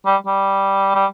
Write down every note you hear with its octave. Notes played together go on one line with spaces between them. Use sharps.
G3
G3
G3